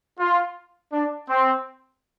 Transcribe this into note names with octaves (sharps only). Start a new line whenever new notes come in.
F4
D4
C4